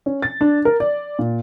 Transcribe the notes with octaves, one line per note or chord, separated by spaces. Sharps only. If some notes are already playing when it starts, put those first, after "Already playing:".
C#4
A6
D4
A#4
D5
A#2